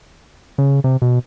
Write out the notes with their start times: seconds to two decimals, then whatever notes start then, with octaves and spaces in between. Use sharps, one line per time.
0.58 C#3
0.84 C3
1.02 B2